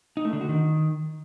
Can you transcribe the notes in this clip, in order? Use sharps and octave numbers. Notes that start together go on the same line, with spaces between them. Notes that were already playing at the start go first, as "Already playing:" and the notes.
D#4
A3
D3
F#4
D#3